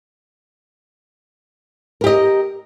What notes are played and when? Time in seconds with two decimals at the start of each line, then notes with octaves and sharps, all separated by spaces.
2.01 A#4
2.04 G4
2.06 D#5